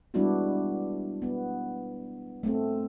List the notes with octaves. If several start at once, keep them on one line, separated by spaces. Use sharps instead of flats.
G3 G#3 B3 D4 E4 F#4
B3
A3 C4 A4